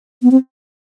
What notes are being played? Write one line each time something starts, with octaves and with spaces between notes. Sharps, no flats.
B3
C4